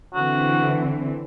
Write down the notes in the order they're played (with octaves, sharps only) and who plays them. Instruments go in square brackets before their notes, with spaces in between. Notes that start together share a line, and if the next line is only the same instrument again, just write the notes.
[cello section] D3 E3 C4 [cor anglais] F#4